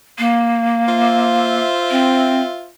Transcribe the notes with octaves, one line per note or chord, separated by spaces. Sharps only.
A#3
F4 C5 E5
C4